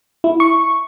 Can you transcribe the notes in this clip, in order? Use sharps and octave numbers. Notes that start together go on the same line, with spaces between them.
E4
C#6